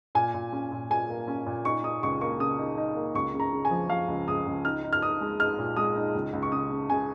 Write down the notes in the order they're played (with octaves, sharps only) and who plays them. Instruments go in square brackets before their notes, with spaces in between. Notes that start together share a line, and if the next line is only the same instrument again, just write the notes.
[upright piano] A#2 G#5
A#2
C#4
A#2
A#2 G#5
A#3
C#4
A#2
D#4 C#6
D#4 D#6
C#2 C#6
A#3 C#6
C#3 D#6
D#4
D#4
A#3
C#2 C#6
C#3
A#5
C#3
G#5
F3
F3 F5
C#2
C#2 D#6
C#2
D#4 F6
D#4
F6
D#4 D#6
G#3
D#4 F6
A#2
G#3 D#6
D#4
C#2
C#2
C#6
C#3 D#6
C#3
C#3 G#5